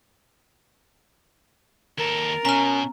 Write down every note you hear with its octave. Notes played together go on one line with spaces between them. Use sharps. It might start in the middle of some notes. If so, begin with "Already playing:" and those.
D#2 A4 A#4
B2 C#4 A#5 F6